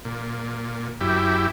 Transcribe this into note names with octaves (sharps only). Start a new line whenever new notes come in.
A#2
F#2 E4 G4